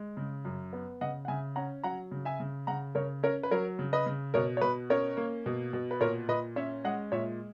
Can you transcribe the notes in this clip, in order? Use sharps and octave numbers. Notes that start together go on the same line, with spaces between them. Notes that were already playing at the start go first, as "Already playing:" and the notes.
Already playing: G#3
C#3
F#2
B3
C#3 D#5 F#5
F#5
C#3 E5 G#5
C#4 F#5 A#5
F#3 F#5 A#5
C#3
E5 G#5
C#3
C#3 F#5 A#5
C#3 A#4 C#5
C#4 A#4 C#5
B4
F#3 A#4 C#5
C#3
B4 D#5
C#3
B2 A#4 C#5
C#5
B2 B4
C#4 A#4 C#5
A#3
B2
B2
B4
A#2 A#4 C#5
A#2 B4 D#5
C#4 C#5 E5
G#3 D#5 F#5
A#2 C#5 E5